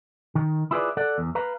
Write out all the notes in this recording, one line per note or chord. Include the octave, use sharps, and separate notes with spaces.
D#3
E4 F4 G#4 B4 C5 D5
A4 D5 F#5
E2
B4 F5 A#5